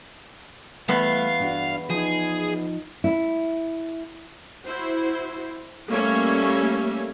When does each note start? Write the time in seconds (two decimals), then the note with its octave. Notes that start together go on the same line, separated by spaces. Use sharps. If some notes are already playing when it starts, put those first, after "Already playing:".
0.89 E2 G3 A3 B3 F5
1.40 G2 D4 F#4
1.90 F3 D#4 G#4
3.04 E4
4.65 E4 F#4 C5
5.88 G3 A3 A#3 C#4 C#5 E5